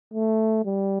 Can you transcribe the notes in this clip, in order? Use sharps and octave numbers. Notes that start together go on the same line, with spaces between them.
A3
G3